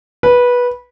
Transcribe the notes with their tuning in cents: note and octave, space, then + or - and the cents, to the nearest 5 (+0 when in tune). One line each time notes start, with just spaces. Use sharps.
B4 -15